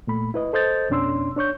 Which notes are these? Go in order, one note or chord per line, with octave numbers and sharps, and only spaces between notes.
A#2 A3 B5
E4 B4 D#5
A4 C5 D#5 G6 A6
F2 B2 C#4 D4 C6 E6
D4 C#5 C#6 G6